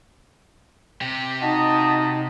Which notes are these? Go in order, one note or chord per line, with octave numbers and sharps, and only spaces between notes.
C3 G4
D#4 F#4 D#5 A5